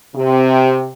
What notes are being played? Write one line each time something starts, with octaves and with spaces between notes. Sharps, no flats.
C3